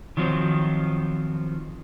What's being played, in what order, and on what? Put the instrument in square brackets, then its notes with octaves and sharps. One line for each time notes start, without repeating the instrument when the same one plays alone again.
[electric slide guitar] D#3 F3 F#3 C4